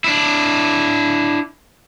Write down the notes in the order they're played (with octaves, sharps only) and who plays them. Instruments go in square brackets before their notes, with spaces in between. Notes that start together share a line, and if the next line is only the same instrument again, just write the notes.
[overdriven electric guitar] D4 E4